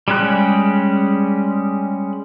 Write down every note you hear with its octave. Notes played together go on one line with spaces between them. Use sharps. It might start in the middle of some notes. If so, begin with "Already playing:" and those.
G3 G#3 C#4 G4 F#6